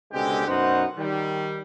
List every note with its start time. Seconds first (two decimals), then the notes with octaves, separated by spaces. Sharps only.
0.12 C#2 B2 D3 G#3 C4 G4
0.46 F#2 B2 D#4 C5 F#5
0.98 D#3 G3